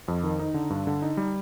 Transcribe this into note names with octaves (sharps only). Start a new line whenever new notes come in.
F2
D#3
D#4
D3
G2
D3
D#4
G3